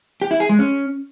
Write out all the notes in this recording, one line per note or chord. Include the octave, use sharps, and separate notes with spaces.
G4
E4
G#4
G#3
C#4